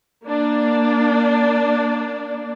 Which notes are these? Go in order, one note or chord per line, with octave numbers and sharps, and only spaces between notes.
A#3 D4